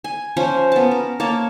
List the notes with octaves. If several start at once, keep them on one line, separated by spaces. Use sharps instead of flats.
G#5
F3 C#4 C5
B3 A5
A#4
A#3 C#5 A5